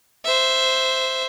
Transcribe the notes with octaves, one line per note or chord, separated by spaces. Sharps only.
C5 E5